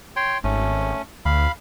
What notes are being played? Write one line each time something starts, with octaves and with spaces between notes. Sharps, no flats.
C#5 G5 C6
G#1 A3 C#4
D2 F5 B5